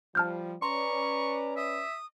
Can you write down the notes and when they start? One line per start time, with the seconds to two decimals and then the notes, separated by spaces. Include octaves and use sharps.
0.15 F3 G3 A5 F6 G6
0.62 C#4 B4 D5 A#5 C6 C#6
1.57 E5 D#6